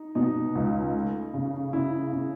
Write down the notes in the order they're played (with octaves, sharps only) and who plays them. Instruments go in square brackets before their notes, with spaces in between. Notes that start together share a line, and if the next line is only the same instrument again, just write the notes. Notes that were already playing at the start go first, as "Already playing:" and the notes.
Already playing: [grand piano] D#4
[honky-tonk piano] B2 [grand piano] D#4
[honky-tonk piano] C#2
A3
C#3
[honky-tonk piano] C#3 [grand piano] E4
[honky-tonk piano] C#3